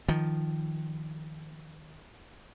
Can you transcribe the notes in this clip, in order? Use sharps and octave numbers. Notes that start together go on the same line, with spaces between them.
D#3 F3